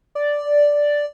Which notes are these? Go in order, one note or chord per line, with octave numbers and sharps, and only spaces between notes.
D5